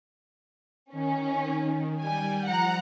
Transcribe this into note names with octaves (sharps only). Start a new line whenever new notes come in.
D#3 C#4
G3 G4 G#5
F3 F#5 A#5